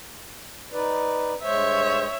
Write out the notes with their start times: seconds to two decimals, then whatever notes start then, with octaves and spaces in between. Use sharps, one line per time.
0.72 D#4 B4 D5
1.43 G2 G#3 C5 C#5 E5